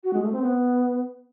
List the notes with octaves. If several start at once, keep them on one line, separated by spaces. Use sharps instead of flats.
F#4
G#3
A3
C4
B3